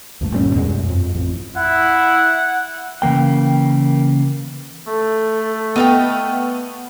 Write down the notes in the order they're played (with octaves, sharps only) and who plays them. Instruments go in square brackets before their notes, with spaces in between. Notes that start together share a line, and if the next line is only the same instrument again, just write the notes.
[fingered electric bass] D2 G2 A3
G1 A#2 G3 C#4
E2 B2 G#3
F#2
F2
A1 F2
[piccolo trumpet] E4 [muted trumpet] F#5
[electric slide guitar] C#3 E3 A#3 G5
[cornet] A3 [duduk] A4
[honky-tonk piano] B3 [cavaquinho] D#5 F5 G5